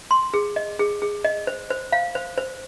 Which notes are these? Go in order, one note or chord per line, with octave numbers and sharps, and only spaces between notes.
C6
G#4
D#5
G#4
G#4
D#5
C5
C5
F5
C5
C5